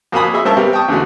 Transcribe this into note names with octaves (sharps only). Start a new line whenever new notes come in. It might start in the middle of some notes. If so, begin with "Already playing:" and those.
F2 A#3 F#4 G#5 B5 D#6
F#4 G#4 D#5 E5 B5
G2 A#4 C5 E5 A5 C#6
C3 G3 B3 A#4
G5 A5 C#6 D#6
E2 D3 G#3 A3 F#4